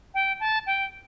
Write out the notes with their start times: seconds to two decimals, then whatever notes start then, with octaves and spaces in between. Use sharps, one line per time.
0.14 G5
0.40 A5
0.66 G5